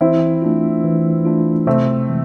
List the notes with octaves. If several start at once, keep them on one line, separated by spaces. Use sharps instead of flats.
E3 C4 E4
A3 D4 F4
E3
A3 D4 F4
C3 A3 C4
E3 G#3